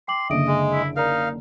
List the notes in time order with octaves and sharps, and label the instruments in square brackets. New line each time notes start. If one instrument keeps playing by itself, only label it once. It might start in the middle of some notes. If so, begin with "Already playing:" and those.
[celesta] G5 D6 F#7 [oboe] C6
[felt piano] F#1 D3 [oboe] D#5 [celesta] E5 D7
[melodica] G#3
[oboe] E4
[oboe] D#4 [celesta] A#4 D5 A#5 [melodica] F5